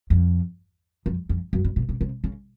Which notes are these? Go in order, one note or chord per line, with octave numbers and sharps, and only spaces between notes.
F2
F2
F2
F#2
G2
B2
C3
C3
C#3